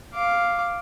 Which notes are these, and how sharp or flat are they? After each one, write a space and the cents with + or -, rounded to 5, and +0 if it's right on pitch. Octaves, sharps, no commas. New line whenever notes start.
F5 +0 D6 +0